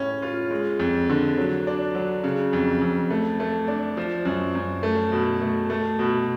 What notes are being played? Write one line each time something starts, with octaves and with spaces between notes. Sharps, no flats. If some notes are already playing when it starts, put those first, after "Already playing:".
Already playing: A2 C#4
F4
G#3
F2
D3
F#3
D4
F#3
C#3
F2
F2
A3
A3
D4
F3
F#2
F#2
A3
B2
A3
A3
B2